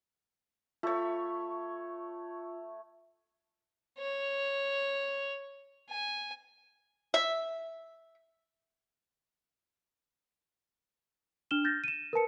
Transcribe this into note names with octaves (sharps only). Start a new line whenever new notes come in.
A3 F4 C#5
C#5
G#5
E5
D4 F6 E7 G7
F6 G6 A6 A#6
D#7 E7
A#4 B4 A5 C#7